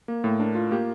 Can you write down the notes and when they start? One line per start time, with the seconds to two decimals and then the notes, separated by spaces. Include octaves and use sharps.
0.08 A#3
0.24 A2
0.40 D4 A#4
0.55 F4
0.71 A#3 G4